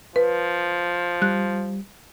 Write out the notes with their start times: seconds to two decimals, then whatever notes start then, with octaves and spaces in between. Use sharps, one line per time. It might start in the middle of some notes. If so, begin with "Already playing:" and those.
0.16 F3 B4
1.22 G3 F#6